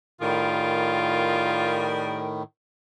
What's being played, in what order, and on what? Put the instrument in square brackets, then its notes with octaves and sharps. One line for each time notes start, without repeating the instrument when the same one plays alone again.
[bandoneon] A2 D#3 [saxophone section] G3 G#4 A#4 [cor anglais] F4